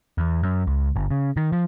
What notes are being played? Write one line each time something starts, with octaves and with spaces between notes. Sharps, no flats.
E2
F#2
C#2
G1
C#3
D#3
F3